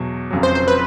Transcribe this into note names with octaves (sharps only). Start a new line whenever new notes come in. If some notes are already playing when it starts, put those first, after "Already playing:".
Already playing: E2 B2 F#3
F1 F2 C#3 F#3
C5
C5
B4